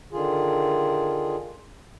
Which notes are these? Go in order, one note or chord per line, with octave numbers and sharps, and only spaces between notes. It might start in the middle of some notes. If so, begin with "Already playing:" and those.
D3 D#3 F4 G#4